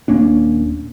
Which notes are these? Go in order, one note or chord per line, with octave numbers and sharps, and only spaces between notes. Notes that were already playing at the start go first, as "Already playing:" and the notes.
D#1 A#3 C#4 D4